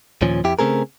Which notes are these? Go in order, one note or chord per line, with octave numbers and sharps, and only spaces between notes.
D#2 A#2 F3 C#4
F2 E4 G4
C#3 A3 C4 G#4 A#4